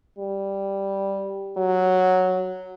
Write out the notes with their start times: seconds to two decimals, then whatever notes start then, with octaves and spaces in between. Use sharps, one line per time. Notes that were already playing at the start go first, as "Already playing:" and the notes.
0.18 G3
1.57 F#3